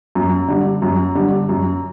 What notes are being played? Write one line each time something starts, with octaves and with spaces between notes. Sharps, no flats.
F#2
D3 G3
F#2
D3 G3
F#2